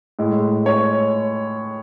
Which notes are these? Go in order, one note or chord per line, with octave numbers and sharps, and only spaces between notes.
A2 G#3
C#5